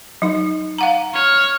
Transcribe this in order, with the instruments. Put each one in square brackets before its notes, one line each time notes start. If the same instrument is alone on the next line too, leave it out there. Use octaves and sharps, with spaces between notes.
[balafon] F#3 D#4
F5 F#5 A#5
[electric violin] C#5 [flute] F6